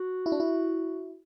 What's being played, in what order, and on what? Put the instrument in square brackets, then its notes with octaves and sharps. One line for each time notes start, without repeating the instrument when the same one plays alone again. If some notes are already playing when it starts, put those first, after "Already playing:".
Already playing: [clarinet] F#4
[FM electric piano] E4
D4
E4